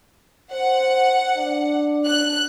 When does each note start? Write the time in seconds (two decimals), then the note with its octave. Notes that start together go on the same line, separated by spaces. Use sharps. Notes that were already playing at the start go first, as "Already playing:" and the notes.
0.52 C5 F#5
1.37 D4
2.06 F#6